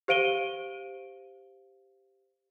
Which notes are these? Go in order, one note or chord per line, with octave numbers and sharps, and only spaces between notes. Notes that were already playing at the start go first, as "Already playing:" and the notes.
G4 C5 F5 D7 D#7 G7